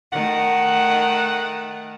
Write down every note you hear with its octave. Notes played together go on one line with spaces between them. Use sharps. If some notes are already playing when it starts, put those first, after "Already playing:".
D#3 A3 F#5